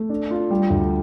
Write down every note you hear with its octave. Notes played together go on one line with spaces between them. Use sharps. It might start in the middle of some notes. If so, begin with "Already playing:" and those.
Already playing: A3
D4
F4
G3
D2